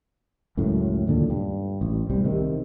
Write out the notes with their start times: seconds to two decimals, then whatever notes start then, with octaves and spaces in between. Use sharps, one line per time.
0.57 C#2 F#2 A2 F#3
1.07 D#2 A#2 D3 D4
1.30 G2
1.81 A1
2.10 C2 C3 G3
2.25 C3 D#3